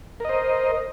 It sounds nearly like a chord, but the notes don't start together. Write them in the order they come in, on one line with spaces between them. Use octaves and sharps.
A#4 D#5 C5